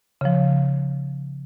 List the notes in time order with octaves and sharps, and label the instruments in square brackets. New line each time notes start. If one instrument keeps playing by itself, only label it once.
[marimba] C#3 F3